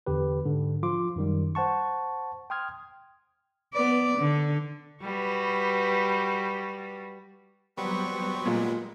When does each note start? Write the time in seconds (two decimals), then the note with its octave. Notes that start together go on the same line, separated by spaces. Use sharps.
0.06 E2 D3 G4 B4
0.45 G#2 D3
0.83 F3 F4 C6 D6
1.16 F#2 D#3 G3
1.55 C5 F#5 A5 C#6
2.50 G5 C6 D#6 F6 G#6
3.73 B3 D5
4.18 D3
5.02 G3 F#4 B4
7.77 F#3 G3 B3 C4 B4 C#6
8.46 A#2 G#3